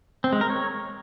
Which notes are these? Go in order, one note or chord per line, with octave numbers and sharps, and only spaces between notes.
C4
G#3
A#4
C#5